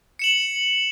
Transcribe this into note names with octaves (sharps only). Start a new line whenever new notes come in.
C#7 E7 F#7